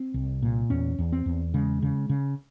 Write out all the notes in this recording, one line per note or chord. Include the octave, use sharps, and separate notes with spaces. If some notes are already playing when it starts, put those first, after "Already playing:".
Already playing: C4
C2
A#2
E2 C#4
E2
C4
E2
C#3 G#3
C#3
C#3